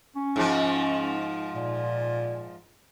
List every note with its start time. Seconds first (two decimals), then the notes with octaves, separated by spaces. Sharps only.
0.16 C#4
0.36 G#2 F3
1.55 A#2